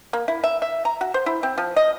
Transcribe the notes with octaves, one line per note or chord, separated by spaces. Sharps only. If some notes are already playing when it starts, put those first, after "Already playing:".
A#3
E4
E5
E5
A#5
F#4
C5
E4
C4
F3
D#5